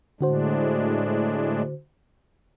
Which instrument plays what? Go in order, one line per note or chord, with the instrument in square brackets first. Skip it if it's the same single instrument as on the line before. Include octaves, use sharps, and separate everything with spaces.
[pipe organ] A2 G#3 D4 [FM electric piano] D3 F#4 C5